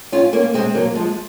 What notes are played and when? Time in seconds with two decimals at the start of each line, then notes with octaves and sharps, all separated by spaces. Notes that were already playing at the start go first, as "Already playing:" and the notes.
0.12 C#4 F4
0.33 A#3 C#4
0.54 G#3 C4
0.75 F#3 A#3
0.95 F3 G#3